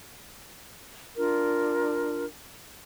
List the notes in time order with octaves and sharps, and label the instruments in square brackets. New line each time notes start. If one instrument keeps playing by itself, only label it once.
[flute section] D4 F4 A#4